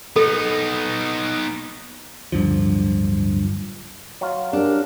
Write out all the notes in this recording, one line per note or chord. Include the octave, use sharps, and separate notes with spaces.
B3 D#4 A4
D1 G2 D3 F3
F#3 F4
D4 G4 A#4